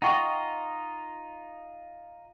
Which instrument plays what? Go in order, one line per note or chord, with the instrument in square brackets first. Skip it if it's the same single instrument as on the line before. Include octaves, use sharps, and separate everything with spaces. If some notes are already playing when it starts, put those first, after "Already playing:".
[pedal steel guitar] D#4 F4 D#5 [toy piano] F#5 G5 C#6